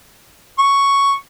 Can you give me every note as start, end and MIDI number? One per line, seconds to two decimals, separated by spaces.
0.59 1.14 85